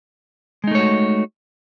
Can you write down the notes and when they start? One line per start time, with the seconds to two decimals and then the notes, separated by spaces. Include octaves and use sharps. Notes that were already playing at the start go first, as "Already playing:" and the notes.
0.64 G#3
0.67 D#4
0.71 A3
0.75 C#5
0.79 F#4